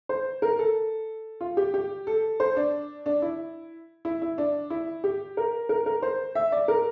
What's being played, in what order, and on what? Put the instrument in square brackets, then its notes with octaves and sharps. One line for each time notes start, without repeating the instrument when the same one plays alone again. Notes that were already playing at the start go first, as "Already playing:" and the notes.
[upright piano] C5
A#4
A4
F4
G4
G4
A4
C5
D4
D4
E4
E4
E4
D4
E4
G4
A#4
A#4
A#4
C5
E5
D5
A#4